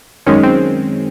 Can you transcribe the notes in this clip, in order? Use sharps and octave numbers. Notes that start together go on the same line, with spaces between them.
F#2 D#3 G#3 C#4
C4